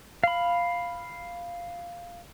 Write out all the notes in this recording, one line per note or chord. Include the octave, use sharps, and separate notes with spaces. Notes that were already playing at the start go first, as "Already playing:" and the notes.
F5 B5